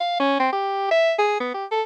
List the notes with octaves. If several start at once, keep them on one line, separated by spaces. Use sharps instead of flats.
F5
C#4
C4
G4
E5
G#4
B3
G4
A4